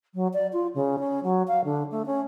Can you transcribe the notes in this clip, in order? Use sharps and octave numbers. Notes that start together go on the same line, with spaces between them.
F#3
D5
F4
C#3
C#4
F#3
F5
D3
A3
C#4